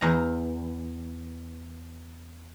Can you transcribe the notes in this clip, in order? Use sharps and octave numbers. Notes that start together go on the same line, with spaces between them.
E2 A#5